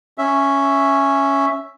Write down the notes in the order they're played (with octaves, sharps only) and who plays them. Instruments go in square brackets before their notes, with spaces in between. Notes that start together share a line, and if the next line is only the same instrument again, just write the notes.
[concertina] C#4 E5